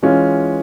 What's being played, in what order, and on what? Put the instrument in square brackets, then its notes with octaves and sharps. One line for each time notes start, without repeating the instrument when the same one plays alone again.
[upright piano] E3 G#3 C#4 F4